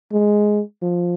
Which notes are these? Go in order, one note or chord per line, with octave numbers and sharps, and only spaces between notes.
G#3
F3